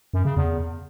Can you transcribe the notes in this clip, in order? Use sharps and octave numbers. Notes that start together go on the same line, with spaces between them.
F#2
C#3
E2